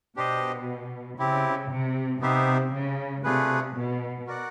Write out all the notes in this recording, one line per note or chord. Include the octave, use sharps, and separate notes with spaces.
B2 D4 G4 C5 D#5
C#3 C4 E4 G4
C3
C3 B3 D#4 G4 C5 E5
C#3
C3 A3 D4 F4 G#4 B4
B2
F#4 A#4 D5 F#5